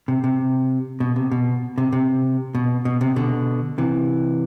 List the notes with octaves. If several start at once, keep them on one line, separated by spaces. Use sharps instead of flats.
C3
C3
B2
C3
B2
C3
C3
B2
B2
C3
B2 D3
C3 E3